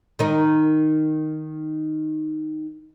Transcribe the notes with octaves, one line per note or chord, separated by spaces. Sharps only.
D#3 D#4